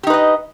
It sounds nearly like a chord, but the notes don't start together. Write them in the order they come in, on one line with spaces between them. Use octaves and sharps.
G4 D#4 B4 D#5